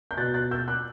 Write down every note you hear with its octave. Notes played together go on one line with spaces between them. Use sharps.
G6
B2 F#6 A6
F#6 A6
E6 G6
D6 F#6